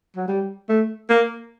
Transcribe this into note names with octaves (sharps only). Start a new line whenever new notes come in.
F#3
G3
A3
A#3